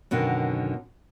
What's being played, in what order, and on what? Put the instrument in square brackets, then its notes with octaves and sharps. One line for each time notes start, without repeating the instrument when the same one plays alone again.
[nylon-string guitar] F#2 B2 D3 D#3